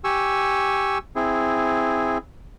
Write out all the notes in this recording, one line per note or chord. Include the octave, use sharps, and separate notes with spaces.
G4 G#5 C#6 E6
C4 E4 G#4